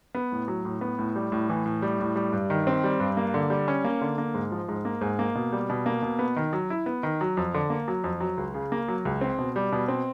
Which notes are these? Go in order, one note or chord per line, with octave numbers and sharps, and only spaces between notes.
B3
A2
F#3
A2
B3
A2
G3
A2
E3
A2
G3
A2
G3
G2
D#3
C4
G3
G2
A#3
D3
G3
C#4
A#3
D3
A#3
G#2
F3
G#2
A#3
G#2
A#3
B2
G3
B2
A#3
B2
B3
D#3
F#3
E4
B3
D#3
F#3
F2
D3
A#3
F#3
F2
F#3
C#2
C#3
A#3
F#3
C#2
C4
B2
G3
B2
C4